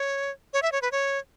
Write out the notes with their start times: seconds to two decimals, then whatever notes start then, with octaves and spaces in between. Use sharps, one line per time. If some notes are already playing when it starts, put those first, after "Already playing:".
Already playing: C#5
0.53 C#5
0.63 E5
0.72 C#5
0.82 B4
0.92 C#5